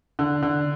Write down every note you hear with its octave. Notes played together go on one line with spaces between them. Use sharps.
D3
D3